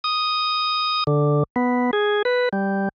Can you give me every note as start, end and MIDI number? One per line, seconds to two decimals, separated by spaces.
0.04 1.04 87
1.07 1.43 50
1.56 1.91 59
1.93 2.22 68
2.25 2.49 71
2.53 2.89 55